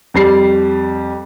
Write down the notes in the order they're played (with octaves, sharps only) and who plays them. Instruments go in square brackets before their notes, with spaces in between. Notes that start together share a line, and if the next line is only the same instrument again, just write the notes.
[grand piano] F2 G3 C7